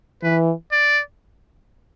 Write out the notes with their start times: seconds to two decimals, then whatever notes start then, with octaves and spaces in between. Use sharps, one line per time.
0.23 E3 B4
0.72 D5